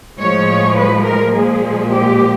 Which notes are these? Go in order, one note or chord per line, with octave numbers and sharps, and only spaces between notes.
A2 F3 G#3 C#5
B4
A#4
A#2 F3 G#3 G#4
G4